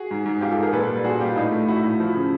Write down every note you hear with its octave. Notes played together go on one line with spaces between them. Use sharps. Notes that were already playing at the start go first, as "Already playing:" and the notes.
Already playing: F#4 G#4
G#2
G#2
G#2 F4 G4
G4 A4
G#2
G#4 A#4
A#2 A4 B4
G3
A#2 F#4 G#4
G3 F4 G4
A2 D#4 F4
A3
A2 E4 F#4
A2
F3
C#3